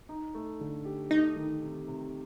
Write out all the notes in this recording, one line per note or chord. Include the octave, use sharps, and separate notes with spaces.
D#4
A3
D3
G4
A3 D#4
D#3
C3
C3